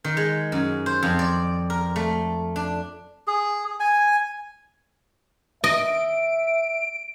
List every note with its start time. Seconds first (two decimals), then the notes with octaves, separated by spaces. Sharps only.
0.04 D#3
0.17 G#3
0.52 F#2
0.86 C5
1.03 F2
1.19 D5
1.70 A#4
1.96 A3
2.56 D4
3.27 G#4
3.80 G#5
5.64 D#5 E5 D7